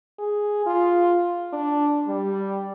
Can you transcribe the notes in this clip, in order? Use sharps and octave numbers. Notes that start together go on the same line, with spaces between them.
G#4
F4
D4
G3